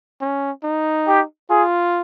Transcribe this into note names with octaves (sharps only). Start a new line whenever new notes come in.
C#4
D#4
G4
F4 G#4